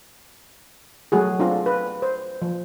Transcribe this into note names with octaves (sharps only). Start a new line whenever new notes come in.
F#3 A3 F#4 G#4
C4 D4 F4 A4
B4
C5
F3